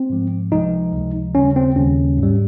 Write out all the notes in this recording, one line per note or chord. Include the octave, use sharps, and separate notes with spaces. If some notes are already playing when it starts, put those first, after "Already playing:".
Already playing: C4
G#2 F3 G#3
C#2 C3 F3 G#3 D#4
C#2 C3 F3 G#3
D#2 C#3 G3 C#4
C4
D#2 C#3 G3 C#4
G#2
G3